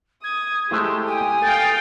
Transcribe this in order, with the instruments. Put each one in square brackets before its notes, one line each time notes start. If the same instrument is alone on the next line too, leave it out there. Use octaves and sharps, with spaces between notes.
[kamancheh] D#6 [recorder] G#6
[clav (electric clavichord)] G#3 A3 E4 [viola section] G4 [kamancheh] C5 [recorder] A5
[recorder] G5 [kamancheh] G#5 D#6
[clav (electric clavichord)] A4 [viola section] F5 G5 [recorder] A6